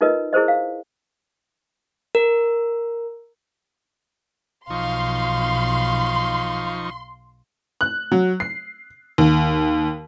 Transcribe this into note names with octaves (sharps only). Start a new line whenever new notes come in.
D#4 F4 A#4 B4 D#5
E4 G#4 A#4 C5 D#5
F5
A#4
B1 F3 D#4 F5 C6 C#6
F#6
F#3
C7
D#2